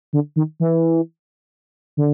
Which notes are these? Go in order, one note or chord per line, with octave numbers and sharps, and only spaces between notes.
D3
D#3
E3
D3